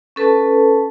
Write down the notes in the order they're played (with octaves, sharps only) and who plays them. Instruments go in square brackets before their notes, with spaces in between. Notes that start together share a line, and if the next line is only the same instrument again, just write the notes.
[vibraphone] C#4 A4 B4 A5